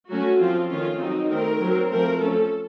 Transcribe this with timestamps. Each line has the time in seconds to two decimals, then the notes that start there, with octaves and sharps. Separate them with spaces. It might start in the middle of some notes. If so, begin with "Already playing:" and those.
0.09 F#3 A3 C#4 F#4
0.39 F3 C4 F4
0.69 D#3 A3 C#4 F4
0.99 F#3 C4 D#4
1.29 D#3 A3 C4 A#4
1.60 F#3 C4
1.89 F3 A3 C4 A#4
2.19 F3 A3 C#4 A4